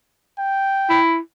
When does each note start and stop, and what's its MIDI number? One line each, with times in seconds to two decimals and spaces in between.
0.39 1.00 79
0.90 1.17 64